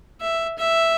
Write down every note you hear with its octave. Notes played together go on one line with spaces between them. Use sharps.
E5
E5